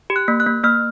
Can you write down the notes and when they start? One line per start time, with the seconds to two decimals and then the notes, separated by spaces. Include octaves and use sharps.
0.10 G4
0.16 F#6
0.28 A#3
0.40 F#6
0.46 A#3
0.63 A#3 F6